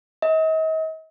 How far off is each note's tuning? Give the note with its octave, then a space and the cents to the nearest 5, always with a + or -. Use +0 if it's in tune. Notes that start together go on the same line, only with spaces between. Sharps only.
D#5 +40